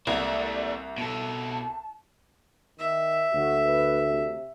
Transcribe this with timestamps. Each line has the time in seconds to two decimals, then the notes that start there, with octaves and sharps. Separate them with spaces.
0.07 C2 A#3 A4 D5
0.98 B2 A4 A5
2.79 D#3 E5
3.34 D2 F#4
3.66 B4
4.07 C3